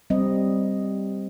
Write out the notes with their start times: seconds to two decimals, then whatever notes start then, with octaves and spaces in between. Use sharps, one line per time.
0.10 G3 C4 D#5